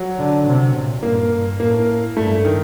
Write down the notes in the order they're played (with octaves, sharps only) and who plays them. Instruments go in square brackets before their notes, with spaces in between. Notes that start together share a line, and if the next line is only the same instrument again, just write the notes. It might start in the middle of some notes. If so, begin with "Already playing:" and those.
Already playing: [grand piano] F#3
[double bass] D3
C3
A#2
[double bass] G2 [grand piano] A#3
[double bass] G2
[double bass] A2 [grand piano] A#3
[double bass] G2 [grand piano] A3
[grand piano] D#3